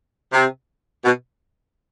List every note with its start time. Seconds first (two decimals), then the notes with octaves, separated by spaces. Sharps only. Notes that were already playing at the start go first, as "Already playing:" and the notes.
0.33 C3
1.05 B2